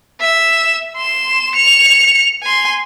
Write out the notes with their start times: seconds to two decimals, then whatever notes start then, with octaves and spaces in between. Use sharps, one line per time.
0.21 E5 E7
0.97 C6 E7
1.55 C#7 F7
2.43 G#5 C6